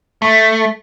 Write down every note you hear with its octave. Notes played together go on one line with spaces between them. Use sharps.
A3